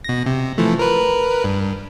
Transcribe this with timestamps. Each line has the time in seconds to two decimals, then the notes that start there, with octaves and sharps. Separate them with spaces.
0.04 B2 A#6
0.26 C3
0.58 E3 F3 A3
0.79 A#4 B4
1.44 G2